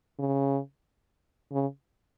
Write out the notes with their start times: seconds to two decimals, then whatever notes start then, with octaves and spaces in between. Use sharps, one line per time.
0.19 C#3
1.52 C#3